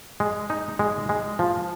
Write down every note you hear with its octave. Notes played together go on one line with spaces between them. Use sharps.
G#3
D#4
G#3
G#3
F3